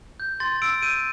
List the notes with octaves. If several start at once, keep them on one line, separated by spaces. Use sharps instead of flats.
G6
C6 A6
E6 D7
G6 D#7